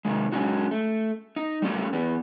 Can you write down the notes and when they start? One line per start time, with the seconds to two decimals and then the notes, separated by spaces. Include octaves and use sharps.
0.05 C3 D#3 G#3
0.32 F#3 G#3 C#4 D#4 F#4
0.71 A3
1.36 D#4
1.62 G3 A3 C#4 G4
1.93 E2 B3